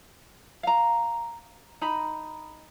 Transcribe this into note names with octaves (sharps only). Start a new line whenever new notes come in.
F5 A#5
D#4 A#5 B5